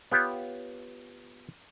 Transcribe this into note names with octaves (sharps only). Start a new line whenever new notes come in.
B3 F4 G4 C#5